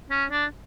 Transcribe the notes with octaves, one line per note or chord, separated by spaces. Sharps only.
C#4
D4